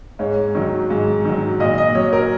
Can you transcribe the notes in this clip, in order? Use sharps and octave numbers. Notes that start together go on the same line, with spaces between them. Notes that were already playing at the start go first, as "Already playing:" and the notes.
G#2 C#5
D#3 F#3
G#2
D#3 F#3
A#2 D#5
D#5
F#3 C#5
A#4